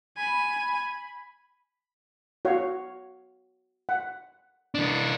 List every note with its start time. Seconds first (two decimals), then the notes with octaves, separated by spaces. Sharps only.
0.17 G#5 B5
2.45 F#4 C#5 F5
3.89 F#5
4.75 E3 D4